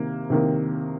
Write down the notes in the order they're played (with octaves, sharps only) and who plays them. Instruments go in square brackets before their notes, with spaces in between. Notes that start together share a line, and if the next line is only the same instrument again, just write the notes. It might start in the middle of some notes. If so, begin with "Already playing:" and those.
Already playing: [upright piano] C3 D#3 A#3
C3 D#3 A#3